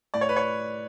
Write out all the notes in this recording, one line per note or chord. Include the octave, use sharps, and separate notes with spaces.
A2 D5
C#5
B4
C#5